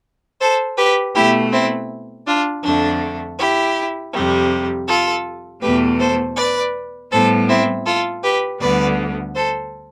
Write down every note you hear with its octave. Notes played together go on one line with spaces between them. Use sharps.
A4 C5
G4 B4
B2 A3 E4 G4
C4 E4
D4 F4
F2 D3 A3 D4
E4 G4
F2 C3 G3
F4 A4
E2 B2 A3 G4 B4
A4 C5
B4 D5
A2 G3 B3 A4 C5
C4 E4
F4 A4
G4 B4
D2 D3 G3 B3 B4 D5
A4 C5